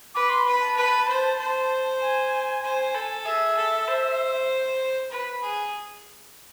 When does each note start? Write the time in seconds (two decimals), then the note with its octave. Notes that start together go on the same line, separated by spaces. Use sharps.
0.15 B4 D6
0.30 C6
0.46 B4 B5
0.61 A5
0.76 B4
1.08 C5
1.38 C5
2.01 G#5
2.64 C5
2.95 A4
3.25 G#4 E5
3.57 A4
3.88 C5
5.11 B4
5.42 G#4